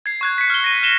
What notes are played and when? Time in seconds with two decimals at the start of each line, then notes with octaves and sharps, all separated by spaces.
0.06 G#6 C7
0.21 C#6 F#6 G#6
0.38 B6 C#7
0.50 F6 G7
0.64 A#6 D#7
0.83 F#6 E7 G7